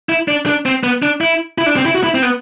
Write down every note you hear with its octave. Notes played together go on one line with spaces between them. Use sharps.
E4
D4
D4
C4
B3
D4
E4
E4
D4
C4
E4
F#4
E4
C4
B3